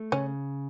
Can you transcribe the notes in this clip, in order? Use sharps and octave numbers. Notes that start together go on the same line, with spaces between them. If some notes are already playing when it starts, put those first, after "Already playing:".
Already playing: A3
C#3 C#4